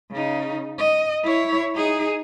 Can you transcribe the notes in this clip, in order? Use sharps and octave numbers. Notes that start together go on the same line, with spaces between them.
C#3 D#4
D#5
E4 C#5
D#4 G#4